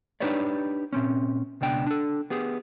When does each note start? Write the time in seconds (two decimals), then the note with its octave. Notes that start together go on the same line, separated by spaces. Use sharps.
0.20 D4 D#4 G4 B4 C#5 D5
0.93 A#2 C4 C#4
1.61 C#2 B2 D4 G5
1.86 D4 A4
2.30 B3 G4 G#4